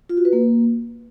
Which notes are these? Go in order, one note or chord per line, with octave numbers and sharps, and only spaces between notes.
F4
F#4
B4
A#3